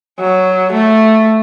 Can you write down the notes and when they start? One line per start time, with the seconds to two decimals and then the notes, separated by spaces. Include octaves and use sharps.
0.20 F#3
0.73 A3